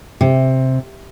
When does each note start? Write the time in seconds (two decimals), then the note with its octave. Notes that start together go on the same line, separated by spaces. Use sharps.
0.21 C3